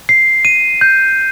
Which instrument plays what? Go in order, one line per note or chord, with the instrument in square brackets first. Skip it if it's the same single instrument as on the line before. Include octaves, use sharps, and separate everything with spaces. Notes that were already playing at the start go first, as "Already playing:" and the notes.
[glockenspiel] C7
D#7
G6